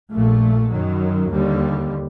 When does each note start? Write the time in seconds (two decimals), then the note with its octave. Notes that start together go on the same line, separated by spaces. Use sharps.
0.12 A#1 A#2 A3
0.71 F#2 D#3 F#3
1.32 D#2 D3 G3